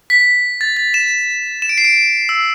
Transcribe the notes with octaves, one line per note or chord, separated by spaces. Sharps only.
B6
A6
A6
E7
E7
D7
C7
D7
E6